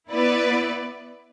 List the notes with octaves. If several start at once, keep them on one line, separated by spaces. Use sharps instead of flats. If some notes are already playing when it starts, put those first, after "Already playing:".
B3 E4 B4 D5